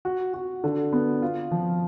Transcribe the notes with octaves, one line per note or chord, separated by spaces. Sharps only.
F#4
F#4
D3
B3
F4
F3